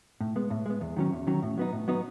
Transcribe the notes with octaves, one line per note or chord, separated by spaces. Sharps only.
A2
G#3 B3
A2
G#3 B3
E2
D#3 F#3 C#4
E2
D#3 F#3 C#4
A2
F#3 B3 D#4
A2
F#3 B3 D#4